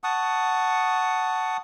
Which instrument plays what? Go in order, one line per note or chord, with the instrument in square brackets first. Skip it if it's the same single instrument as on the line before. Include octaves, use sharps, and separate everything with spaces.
[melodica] F#5 A5 C#6 D#6